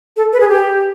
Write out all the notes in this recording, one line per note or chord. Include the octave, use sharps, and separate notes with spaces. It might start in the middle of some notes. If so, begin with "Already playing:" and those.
A4
B4
G#4
G4